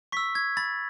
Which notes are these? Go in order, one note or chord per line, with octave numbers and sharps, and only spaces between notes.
C#6 E6 B6
G#6
B5 A6